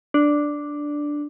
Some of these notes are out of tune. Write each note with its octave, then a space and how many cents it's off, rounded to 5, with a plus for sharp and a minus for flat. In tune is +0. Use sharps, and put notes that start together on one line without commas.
D4 +0